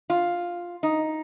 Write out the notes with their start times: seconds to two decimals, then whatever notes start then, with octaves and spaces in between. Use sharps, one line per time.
0.10 F4
0.83 D#4